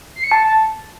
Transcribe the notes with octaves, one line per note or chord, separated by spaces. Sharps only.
C7
C#7
A5